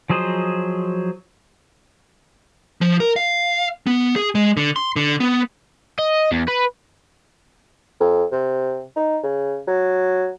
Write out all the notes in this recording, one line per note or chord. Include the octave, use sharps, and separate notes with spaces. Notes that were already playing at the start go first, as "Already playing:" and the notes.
F3 F#3 G#4 C5 D#5
F3
A#4
F5
B3
G#4
G#3
D3
C6
D3
B3
D#5
E2
B4
F2
C3
D#4
C#3
F#3